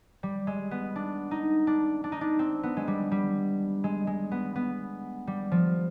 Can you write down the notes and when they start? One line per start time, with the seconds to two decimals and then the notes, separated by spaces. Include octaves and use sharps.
0.23 G3
0.47 G#3
0.71 B3
0.96 D4
1.31 D#4
1.67 D4
2.04 D4
2.12 D#4
2.21 D4
2.39 C4
2.63 B3
2.77 G#3
2.88 G3
3.11 G3
3.84 G#3
4.07 G#3
4.31 B3
4.56 B3
5.27 G3
5.52 F3